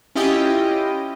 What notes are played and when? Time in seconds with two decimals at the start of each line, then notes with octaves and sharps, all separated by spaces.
0.15 C#4 E4 F4 G4 D#5 G5